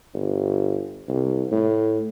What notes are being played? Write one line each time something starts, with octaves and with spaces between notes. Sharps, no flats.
G1
C2
A2